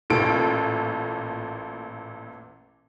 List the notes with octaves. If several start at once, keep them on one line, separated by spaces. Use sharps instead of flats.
A1 A#2 A4 D7